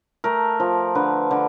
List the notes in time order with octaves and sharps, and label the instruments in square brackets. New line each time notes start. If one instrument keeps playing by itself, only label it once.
[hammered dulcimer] A3 A#4
F3
D3 B4
D3